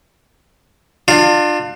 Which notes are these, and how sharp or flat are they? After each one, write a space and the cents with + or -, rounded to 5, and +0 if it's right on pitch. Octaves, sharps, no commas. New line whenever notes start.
D4 +35 F4 +15